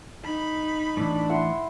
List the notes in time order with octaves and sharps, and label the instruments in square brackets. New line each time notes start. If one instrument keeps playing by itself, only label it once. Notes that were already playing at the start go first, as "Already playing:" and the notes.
[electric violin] D#4 B5
[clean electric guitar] A2 E3 [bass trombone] D4
[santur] E4 F#5 C6